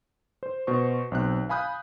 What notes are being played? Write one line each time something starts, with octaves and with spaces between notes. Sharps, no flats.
C5
B2 C5 C#6
B1 C4 F#6
F5 G#5 B5 D#6 F#6 G6